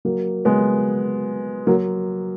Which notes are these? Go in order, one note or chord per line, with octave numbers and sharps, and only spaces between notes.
F#3 A#3
G#3 B3
F#3 A#3